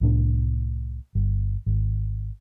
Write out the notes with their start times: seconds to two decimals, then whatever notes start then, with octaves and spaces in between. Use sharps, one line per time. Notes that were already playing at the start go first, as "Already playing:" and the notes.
0.01 C2 A2 D4
1.15 G1
1.66 G#1